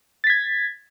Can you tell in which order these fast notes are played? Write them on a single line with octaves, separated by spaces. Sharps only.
A6 B6 G#6